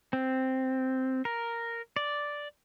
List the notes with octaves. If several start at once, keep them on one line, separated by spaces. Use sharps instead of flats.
C4
A#4
D5